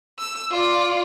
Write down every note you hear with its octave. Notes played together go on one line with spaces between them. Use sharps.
E6
F4 D5